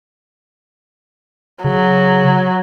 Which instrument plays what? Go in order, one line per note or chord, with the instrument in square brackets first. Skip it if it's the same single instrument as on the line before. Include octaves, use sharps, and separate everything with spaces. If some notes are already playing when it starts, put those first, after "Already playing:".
[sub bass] C#3 [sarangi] F#3